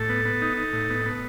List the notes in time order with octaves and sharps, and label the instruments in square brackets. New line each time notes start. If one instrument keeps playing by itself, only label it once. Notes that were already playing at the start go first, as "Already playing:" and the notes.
Already playing: [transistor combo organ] A2 A4
B3
B3
D#4
D#4
A2
B3
B3